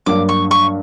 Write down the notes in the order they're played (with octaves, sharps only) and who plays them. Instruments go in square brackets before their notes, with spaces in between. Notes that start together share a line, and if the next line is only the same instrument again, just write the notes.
[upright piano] G2 F#3 A#3 [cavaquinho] D6
[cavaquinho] C#6
C#6